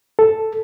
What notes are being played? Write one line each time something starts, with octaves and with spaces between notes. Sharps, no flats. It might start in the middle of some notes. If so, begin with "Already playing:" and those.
A4